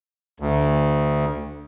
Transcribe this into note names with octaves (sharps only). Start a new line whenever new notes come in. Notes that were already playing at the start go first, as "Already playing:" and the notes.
D2